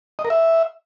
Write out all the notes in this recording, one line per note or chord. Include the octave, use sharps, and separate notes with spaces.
D#5
A#4
E5